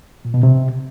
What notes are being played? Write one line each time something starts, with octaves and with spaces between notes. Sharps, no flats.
A#2
B2
C3